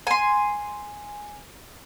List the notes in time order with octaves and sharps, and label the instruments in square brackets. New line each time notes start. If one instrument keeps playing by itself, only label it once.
[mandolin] G#5 C6